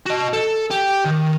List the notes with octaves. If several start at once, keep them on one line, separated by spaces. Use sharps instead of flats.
F#4 D#5
A4
G4
D#3